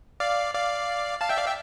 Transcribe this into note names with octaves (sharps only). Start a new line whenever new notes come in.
D5 F5
D5 F5
F5 A5
E5 G5
D5 F5
E5 G5